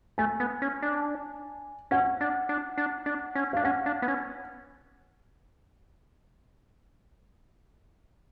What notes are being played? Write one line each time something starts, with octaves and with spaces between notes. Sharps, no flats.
A3 G#5
B3
C#4
D4
C#4 F#5
D4
D4
D4
D4
C#4
D4 F5
C#4 F#5
D4
B3
C#4